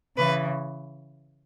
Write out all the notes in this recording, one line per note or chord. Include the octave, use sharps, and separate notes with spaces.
C#3 E3 B4